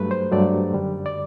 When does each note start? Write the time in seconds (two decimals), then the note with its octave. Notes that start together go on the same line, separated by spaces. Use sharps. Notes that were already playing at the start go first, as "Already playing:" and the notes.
Already playing: G2 F#3 A3 B4
0.11 C5
0.32 G2 F#3 A3 D5
0.73 F#2 D3 G3
1.06 D5